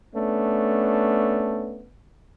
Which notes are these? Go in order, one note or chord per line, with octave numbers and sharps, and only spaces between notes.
A3 B3 C#4 D4